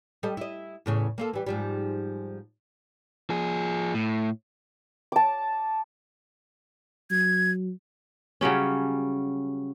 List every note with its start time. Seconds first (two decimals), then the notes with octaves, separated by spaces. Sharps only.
0.23 G3 A4 D#5
0.37 E4 D#5
0.86 E2 A2 C#3
1.18 A#3 F4 A4
1.33 E3 G3
1.47 G#2 F3 G3
3.30 F3 G#4
3.94 A2
5.12 A5 D6
7.11 F#3 G#6
8.41 C#3 F#3 G3 C#4